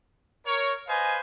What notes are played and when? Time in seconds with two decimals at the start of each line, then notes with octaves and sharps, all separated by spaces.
0.47 A#4 C#5
0.88 B4 C5 D#5 F5 G#5